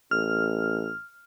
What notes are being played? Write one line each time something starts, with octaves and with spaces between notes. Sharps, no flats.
A1 F6